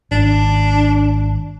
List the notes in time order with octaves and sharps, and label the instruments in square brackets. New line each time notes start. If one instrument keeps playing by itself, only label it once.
[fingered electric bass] G#1 [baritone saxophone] D4